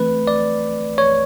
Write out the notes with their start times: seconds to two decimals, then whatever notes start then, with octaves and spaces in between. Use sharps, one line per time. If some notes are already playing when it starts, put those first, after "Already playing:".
Already playing: E3 A3 C4 B4
0.27 D5
0.98 C#5